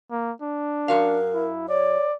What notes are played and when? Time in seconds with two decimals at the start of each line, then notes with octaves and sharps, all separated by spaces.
0.11 A#3
0.42 D4
0.88 F#2 F#4 A#4 F5
1.34 E4
1.69 C#5 D5